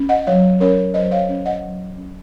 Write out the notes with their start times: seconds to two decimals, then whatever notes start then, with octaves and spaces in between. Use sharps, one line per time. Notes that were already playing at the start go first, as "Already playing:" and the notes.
Already playing: C#4
0.09 D#5 F#5
0.27 F#3 C#5 F5
0.60 C#4 A#4 C#5
0.94 F#3 C5 D#5
1.11 C#5 F5
1.29 C#4
1.46 D#5 F#5
1.62 F#3
1.97 C#4